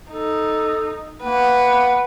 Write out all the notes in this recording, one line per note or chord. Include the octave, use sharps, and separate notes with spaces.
D#4 A4
A#3 B4 F#5